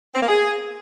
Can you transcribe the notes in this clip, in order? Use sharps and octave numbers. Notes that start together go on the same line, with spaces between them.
C4
A#3
G#4